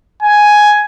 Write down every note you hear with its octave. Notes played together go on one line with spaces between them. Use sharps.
G#5